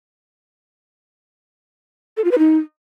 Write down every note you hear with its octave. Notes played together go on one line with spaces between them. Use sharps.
A4
F4
B4
D#4